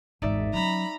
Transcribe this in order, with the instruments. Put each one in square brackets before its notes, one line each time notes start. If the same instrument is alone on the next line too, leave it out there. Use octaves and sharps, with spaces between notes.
[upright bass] G#1 E2 [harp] D#4 D5 E5
[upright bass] F#3 C#4 [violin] A#5 B5